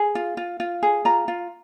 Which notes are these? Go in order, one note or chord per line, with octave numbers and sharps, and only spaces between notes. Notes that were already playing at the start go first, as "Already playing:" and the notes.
Already playing: G#4
F4
F4
F4
G#4
F4 A#5
F4